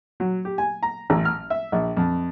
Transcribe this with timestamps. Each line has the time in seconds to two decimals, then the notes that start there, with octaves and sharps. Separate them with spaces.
0.20 F#3
0.45 G4
0.58 G#5
0.83 A#5
1.10 A1
1.25 F6
1.50 E5
1.72 A#1
1.97 F2